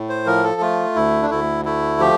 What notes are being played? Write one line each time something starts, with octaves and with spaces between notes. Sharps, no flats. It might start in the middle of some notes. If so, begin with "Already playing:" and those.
Already playing: A2
C5
F3 A#4
A4
A3 F4
D2 E4
D4
D2 E4
A3 E4
F3 G4